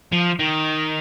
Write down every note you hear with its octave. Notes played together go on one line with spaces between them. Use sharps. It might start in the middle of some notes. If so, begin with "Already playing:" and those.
F3
D#3